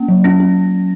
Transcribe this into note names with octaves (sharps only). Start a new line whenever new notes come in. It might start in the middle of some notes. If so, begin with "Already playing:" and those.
Already playing: A#3 C#4
F#3
C#4 A#6
C#4